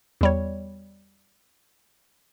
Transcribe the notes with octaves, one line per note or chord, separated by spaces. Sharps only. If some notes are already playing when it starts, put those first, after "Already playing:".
E2 G3 C#5